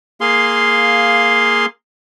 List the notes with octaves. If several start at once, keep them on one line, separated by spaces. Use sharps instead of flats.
A#3 G#4 F5 C6